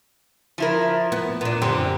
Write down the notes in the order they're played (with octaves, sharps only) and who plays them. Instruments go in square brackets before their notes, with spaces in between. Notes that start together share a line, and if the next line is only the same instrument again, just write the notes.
[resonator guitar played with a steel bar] F3 E4 A#4
[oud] B3
[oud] A#2 D4 [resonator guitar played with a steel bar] B3
[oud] F#2 D3 C4 [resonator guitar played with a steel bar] G4